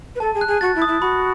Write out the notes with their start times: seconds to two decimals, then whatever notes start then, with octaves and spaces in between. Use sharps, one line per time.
0.15 B4
0.20 A4 A5
0.34 G#4
0.41 F#6
0.48 G#4
0.61 F#4 A6
0.75 E4
0.82 D#6
0.88 E4
1.01 F#4 B5